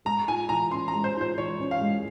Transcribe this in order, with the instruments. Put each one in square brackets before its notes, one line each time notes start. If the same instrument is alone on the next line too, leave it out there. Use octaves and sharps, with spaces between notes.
[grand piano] G#3 [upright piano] A#5
[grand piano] F4 [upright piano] G#5
[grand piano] E3 [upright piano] A#5
[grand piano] C#4 [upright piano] C6
[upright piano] A#5
[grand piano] G#3
[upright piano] C5
[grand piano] F4 [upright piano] C5
[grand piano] E3 [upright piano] C#5
[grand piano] C#4
[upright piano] F5
[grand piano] G#3